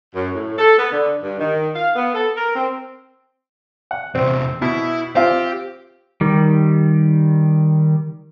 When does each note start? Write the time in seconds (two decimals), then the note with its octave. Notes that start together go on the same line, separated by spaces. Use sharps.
0.15 F#2
0.35 A2
0.58 A4
0.79 B3
0.92 D3
1.23 G2
1.39 D#3
1.75 F5
1.96 B3
2.14 A4
2.36 A#4
2.56 C4
3.91 F#5
4.15 E2 C3 C4
4.62 B2 E4
5.15 C4 F4 G4
6.21 D#3 G3